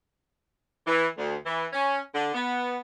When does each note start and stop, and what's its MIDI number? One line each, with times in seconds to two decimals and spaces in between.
0.87 1.06 52
1.18 1.35 38
1.46 1.66 52
1.73 1.99 61
2.15 2.31 50
2.34 2.78 59